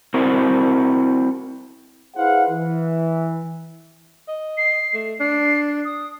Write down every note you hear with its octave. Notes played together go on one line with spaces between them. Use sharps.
C4 E4 F#4 A#4 C5
E4 G#4 B4 C5 F5 F#5
E3
D#5
C7
A3
D4 C7
D#6